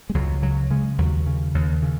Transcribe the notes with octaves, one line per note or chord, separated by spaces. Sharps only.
G#3
C#2 F#3
C#3 F#3
C#3 G#3
D#2 F#3
C#3
D#2
C#3